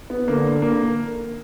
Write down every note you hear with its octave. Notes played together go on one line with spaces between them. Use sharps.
B3
D3 A#3
A#3